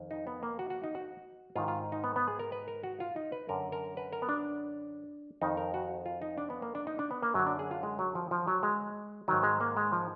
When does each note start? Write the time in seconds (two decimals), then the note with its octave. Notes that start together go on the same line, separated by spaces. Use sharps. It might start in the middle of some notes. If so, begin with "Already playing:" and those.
Already playing: F2 D#3
0.11 D#4
0.27 B3
0.43 A#3
0.59 F#4
0.70 F#4
0.84 D#4
0.95 F#4
1.55 G#2 D#3 F4
1.68 F4
1.92 D#4
2.04 B3
2.16 B3
2.28 G#4
2.39 A#4
2.52 B4
2.68 A#4
2.83 F#4
3.00 F4
3.16 D#4
3.32 B4
3.49 F#2 D3 A#4
3.72 A#4
3.97 B4
4.13 A#4
4.22 B3
4.29 D4
5.42 F2 D#3 D#4
5.57 A#4
5.74 F#4
6.06 F4
6.22 D#4
6.38 D4
6.50 B3
6.62 A#3
6.75 D4
6.87 D#4
6.99 D4
7.11 B3
7.22 A#3
7.34 F#2 D3 F#3
7.47 D4
7.59 G#4
7.71 F4
7.83 G#3
7.99 F#3
8.15 F3
8.31 F3
8.47 F#3
8.63 G#3
9.28 G#2 D#3 F#3
9.43 G#3
9.60 A#3
9.77 G#3
9.92 F3